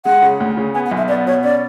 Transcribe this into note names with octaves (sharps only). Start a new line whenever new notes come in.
G#3 F#5
C#3
D2
C#3
B3 G#5
F#5
B1
E5
B3 D5
B2 C#5
C#4 D5